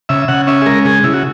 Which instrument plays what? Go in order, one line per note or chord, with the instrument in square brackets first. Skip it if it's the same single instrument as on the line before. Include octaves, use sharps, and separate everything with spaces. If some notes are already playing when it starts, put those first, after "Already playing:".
[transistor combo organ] C#3 E5
C#3 F#5
C#4 E5
G#4
G#3 A#4
C#3 G#4
C#3 E4
F#4